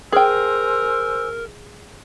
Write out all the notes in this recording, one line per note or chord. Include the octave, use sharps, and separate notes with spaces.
G#4 A#4 C5 G5 G#5 E6